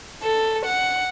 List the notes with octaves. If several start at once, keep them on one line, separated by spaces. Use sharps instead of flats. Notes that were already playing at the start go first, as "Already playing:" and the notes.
A4
F#5